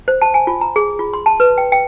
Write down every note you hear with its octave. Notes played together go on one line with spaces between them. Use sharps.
C5
A5
G#5
F4
A#5
G#4
F4
C6
A5
B4
G5
G5